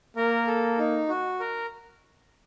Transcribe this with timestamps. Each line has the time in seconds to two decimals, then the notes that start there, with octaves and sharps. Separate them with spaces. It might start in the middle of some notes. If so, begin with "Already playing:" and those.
0.17 A#3 A#4
0.47 A4
0.78 D#4
1.09 F#4
1.40 A#4